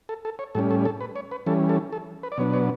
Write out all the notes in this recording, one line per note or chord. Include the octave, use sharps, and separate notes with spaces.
A4
A4
C#5
A2 G3 C#4 A4
A4
A4
B4
C#5
B4
E3 G3 C#4 A4
A4
A4
B4
D5
B2 F#3 B3 D4 C#5
C#5